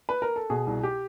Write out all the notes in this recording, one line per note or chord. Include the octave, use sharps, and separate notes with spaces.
B4
A#4
A4
B2 G#4
C2
G4